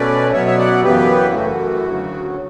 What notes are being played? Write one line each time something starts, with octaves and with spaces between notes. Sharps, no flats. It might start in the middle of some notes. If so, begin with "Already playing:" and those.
Already playing: B2 A3 C#4 B4 D5
B2 F#3 B3 C#5 E5
E5
D5 F#5
F#2 C#3 E3 B3 G4 B4
F#2 E3 A3 F#4
D2 C#3 F#3